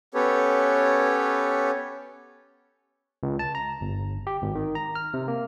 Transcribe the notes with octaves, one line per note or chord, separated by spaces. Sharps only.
B3 C#4 G4 A4 B4 C#5
C#2
A5
A#5
G1
G4
G#1
D#3
A#5
F6
C3
A#3